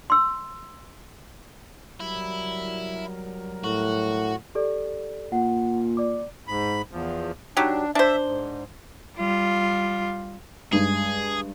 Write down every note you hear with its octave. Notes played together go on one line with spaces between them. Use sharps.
C6 E6
F#3 G3 E4 A#4
A2 F#4
G4 A4 D5
A#2 F#5
D5 D6
G#2 B5
E2 F3
F#3 D4 D#4 G4
D4 C5 E5
G#2
G3 F4
G2 G#3 G#4